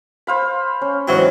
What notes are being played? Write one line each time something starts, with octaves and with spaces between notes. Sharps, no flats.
C5 F5 B5
C#4
G#2 E3 F#3 C4